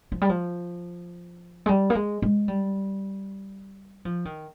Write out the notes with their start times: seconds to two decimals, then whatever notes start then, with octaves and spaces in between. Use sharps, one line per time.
0.12 F3
0.21 G3
0.29 F3
1.66 G#3
1.69 G3
1.90 A#3
1.95 G#3
2.22 G#3
2.48 G3
4.05 F3
4.25 D#3